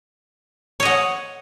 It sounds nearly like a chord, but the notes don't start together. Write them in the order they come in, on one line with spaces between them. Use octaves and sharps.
C#5 D#5 F#5